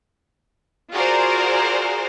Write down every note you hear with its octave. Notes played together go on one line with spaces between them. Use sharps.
F4 F#4 G#4 A#4 C5 D5